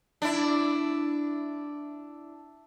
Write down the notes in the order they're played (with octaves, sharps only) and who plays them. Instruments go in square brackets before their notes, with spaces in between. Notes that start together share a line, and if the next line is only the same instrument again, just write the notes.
[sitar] D4 E4